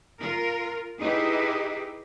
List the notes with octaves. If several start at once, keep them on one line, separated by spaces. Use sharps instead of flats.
F4 A#4
D#4 E4 G4 G#4 B4 D#5